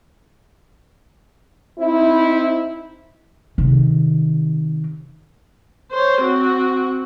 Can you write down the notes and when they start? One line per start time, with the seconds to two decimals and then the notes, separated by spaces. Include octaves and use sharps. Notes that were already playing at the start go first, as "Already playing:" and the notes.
1.78 C4 D#4 E4
3.58 C3 D#3
5.92 C5 C#5
6.22 C4 F#4